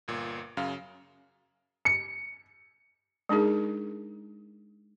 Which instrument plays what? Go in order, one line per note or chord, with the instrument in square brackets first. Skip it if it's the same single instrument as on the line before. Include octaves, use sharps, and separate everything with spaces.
[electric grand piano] G1 A#2
F#2 C#3 F5
[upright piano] C#7
[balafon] G#3 D4 D#4 G#4 A#4